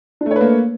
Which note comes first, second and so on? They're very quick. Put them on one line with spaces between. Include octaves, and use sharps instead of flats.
D4 A3 C#5 B4 A#3